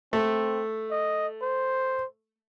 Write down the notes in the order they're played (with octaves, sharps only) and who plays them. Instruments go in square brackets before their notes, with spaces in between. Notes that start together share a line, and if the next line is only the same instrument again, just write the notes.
[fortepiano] A3 [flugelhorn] C4
[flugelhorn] D#5
C5